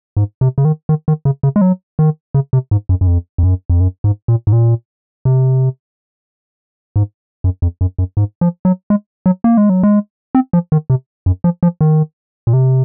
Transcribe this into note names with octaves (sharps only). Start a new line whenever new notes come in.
G#2
C3
C#3
D#3
D#3
D#3
C#3
C#3
G#3
F#3
D#3
C#3
C3
G#2
F#2
F#2
F2
F2
F#2
F2
F#2
G#2
A#2
G#2
A#2
C3
G#2
F#2
F2
F#2
F#2
G#2
F3
F#3
G#3
F#3
A#3
G#3
F#3
G#3
C4
F3
D#3
C3
F#2
F3
F3
D#3
A#2
C3